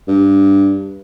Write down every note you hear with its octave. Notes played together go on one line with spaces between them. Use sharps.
G2